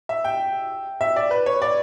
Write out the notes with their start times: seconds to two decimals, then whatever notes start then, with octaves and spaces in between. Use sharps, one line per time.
0.09 E5
0.24 G5
1.01 E5
1.16 D5
1.31 B4
1.46 C#5
1.62 D5